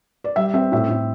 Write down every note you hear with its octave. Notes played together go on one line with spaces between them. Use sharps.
D5
G3 E5
C4 E5
A2 E5
A2